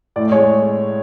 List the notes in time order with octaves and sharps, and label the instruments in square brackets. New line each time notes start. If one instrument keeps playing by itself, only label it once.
[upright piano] A2 D5
G#3 C#5